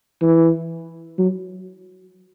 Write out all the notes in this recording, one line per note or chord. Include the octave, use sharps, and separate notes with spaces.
E3
F#3